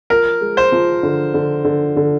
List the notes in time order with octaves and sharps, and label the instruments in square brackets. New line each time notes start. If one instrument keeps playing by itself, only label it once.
[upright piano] F3 [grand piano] A#4
[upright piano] G#3
[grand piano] C5
[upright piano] F3
D3
D3
D3
D3